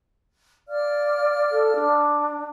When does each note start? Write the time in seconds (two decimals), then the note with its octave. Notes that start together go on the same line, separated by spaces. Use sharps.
0.68 D5 F5 F6
1.52 A4
1.76 D4